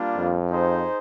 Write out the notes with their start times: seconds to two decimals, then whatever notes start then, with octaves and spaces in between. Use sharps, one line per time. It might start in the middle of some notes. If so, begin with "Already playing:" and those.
Already playing: G3 A#3 D4 F4
0.17 F2
0.50 D#4 G#4 C5